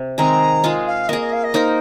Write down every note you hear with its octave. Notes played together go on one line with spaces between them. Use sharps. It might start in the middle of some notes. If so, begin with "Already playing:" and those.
Already playing: C3
D#3 G#3 C4 G#4 A#5
G#3 F4 G#4
F5
A#3 G#4 D#5
D#5
F5
D#5
A#3 D#4 A#4 C5